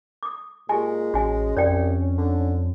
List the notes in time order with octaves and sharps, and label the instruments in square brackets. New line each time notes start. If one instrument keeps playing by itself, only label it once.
[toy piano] D6 D#6
[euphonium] A#2 [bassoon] G#3 [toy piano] G4 G#5
[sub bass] A1 [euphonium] C#4 [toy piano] F#4 G#5
[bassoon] C2 [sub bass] F2 [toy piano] C#5 D5 G5
[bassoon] D3